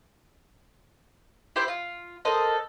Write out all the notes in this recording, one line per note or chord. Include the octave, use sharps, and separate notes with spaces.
E4 G4 C5
F4
A4 A#4 C5 D#5